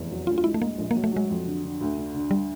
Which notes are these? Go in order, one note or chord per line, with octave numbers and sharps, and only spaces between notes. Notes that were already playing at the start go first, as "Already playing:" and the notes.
Already playing: F1 E2
F#3
D2 F4
F4
G#3 E4
A3
G#3 A#3
A#1
A#3
F#3
A3
F#3 G#3
F2
D3
D3
D2
D3
D3
G3